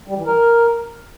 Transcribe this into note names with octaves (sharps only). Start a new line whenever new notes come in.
G3
E3
A#4